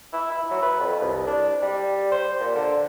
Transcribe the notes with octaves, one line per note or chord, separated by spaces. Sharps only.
E4
E4
F#3
B4
F2
C2
D4
G3
C5
A#2
D3